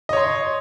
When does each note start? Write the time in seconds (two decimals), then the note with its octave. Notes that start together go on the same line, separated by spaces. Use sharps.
0.09 D#5
0.13 C#5
0.17 C6